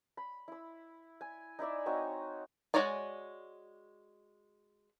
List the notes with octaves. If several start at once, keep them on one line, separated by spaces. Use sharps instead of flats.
B5
E4 E6
G#5
D#4 E4 D5 E5
C4 D#4 F#4 C#5
G#3 F#4 C#5 D5 G#5